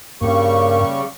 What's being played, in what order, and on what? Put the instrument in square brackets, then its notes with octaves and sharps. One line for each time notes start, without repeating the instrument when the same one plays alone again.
[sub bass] G2 [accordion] C#3 G3 C#6 [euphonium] A#3